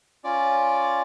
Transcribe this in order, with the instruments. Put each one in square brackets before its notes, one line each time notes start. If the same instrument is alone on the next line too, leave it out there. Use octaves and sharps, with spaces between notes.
[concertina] C#4 F4 D5